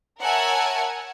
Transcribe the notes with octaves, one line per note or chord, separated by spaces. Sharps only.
A#4 C#5 E5 F#5 G#5 A5